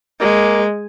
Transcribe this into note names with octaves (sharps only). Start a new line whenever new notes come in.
G#3 A#3